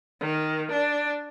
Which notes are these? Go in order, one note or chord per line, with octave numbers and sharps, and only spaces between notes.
D#3
D4